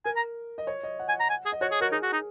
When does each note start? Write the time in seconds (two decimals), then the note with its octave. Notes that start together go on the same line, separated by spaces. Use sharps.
0.05 A#4 G#5
0.16 A#5
0.58 D#5
0.67 C#5
0.83 D#5
0.99 F#5
1.09 G#5
1.20 A#5
1.30 G#5
1.46 G#4
1.52 D#5
1.61 F#4 C#5
1.72 G#4
1.81 F#4 A#4
1.92 D#4 G#4
2.03 F#4
2.13 D#4